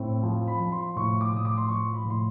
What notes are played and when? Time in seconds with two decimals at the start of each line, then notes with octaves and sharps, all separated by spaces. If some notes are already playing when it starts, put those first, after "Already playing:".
Already playing: A2 C4
0.23 F3
0.48 B5
0.60 F3
0.72 C6
0.96 A2 C#6
1.21 D6
1.32 A2 D#6
1.45 D6
1.57 C6
1.69 F3 C#6
1.94 B5
2.05 A2 C6